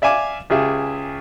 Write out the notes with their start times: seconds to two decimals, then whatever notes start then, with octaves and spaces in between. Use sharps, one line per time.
0.02 D5 E5 F5 G#5 D6
0.50 C#2 G4 G#4 E5